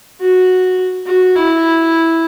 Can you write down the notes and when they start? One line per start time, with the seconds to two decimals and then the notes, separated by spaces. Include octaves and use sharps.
0.20 F#4
1.06 F#4
1.35 E4